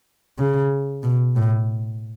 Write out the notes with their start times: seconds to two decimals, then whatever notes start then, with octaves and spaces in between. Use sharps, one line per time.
0.39 C#3
1.03 B2
1.36 A2